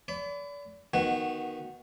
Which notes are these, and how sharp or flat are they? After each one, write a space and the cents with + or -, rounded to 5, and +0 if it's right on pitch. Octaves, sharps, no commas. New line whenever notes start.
D5 -35 B5 +30
D#3 +0 B3 -15 F#4 +0